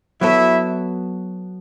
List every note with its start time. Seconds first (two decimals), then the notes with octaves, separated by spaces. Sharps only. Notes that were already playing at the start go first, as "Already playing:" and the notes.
0.21 F#3 B3 E4 F#4 A4 E5